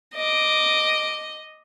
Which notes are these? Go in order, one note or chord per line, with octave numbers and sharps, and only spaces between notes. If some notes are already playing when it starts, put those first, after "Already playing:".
D#5 D6